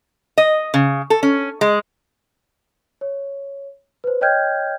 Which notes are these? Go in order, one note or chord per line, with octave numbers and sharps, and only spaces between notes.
D#5
C#3
A4
C#4
G#3
C#5
B4 C5
C#5 D#5 G5 F6 G6 G#6